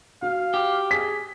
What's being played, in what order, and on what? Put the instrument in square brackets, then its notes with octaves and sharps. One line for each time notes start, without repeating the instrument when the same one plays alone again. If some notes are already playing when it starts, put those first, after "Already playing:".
[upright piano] F#4 [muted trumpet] F5
[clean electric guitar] G4
[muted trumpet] G#4 [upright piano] B6